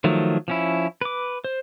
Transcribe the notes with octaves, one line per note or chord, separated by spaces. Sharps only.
D#3 F3 F#3 A3
F3 C#4 E4
B4 D6
C5